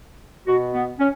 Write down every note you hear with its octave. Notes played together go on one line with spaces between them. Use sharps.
B2 F#4
B3
C#4